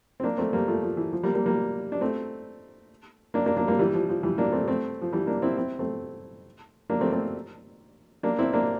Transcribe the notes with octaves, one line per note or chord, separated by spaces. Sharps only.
C4
A#3 D4
A3 C4
G3 A#3
F3 A3
F3
E3
F3
G3 A#3
G3 A#3
G3 A#3
D4
A3 C4
A#3 D4
A#3 D4
A#3 D4
G3 A#3
E3 G3
F3
F3
E3 G3
A#3 D4
A3 C4
A3 C4
F3
E3 G3
A#3 D4
C4 E4
C4 E4
A3 C4
A#3 D4
A3 C4
A3 C4
A#3 D4
C4 E4
A#3 D4